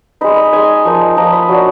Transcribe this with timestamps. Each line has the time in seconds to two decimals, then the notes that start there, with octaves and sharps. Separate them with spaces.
0.21 G#3 D#4 B5
0.37 B5
0.53 G#3 D#4 G#5
0.85 F3 A#3 D#4
1.16 F3 A#3 D#4 A#5
1.32 B5
1.49 F#3 A#3 D4